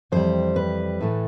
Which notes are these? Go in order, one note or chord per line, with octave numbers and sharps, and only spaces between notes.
F2 E3 G3 C5
B4
A2 E3 A3